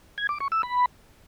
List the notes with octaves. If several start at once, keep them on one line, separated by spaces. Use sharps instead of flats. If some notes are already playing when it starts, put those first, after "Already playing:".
G#6
D6
C#6
E6
B5